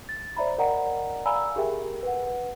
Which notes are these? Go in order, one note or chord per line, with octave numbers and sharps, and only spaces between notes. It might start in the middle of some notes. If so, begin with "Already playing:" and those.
A6
C5 D5 E5 A#5 B5
A#4 D5 D#5 F#5 G5 A#5
D5 F5 G#5 A#5 B5 E6
G4 G#4 A#4 E5 G5 G#5
B4 F#5